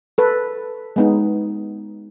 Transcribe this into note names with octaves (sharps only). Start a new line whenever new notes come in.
A4 B4
G#3 B3 D#4